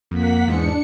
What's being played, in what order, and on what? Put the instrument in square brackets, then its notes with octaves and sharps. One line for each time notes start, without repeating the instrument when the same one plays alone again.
[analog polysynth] F2 [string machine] A#3 F#5 B6
[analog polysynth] E2 G#2 G#3 [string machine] D4 C#7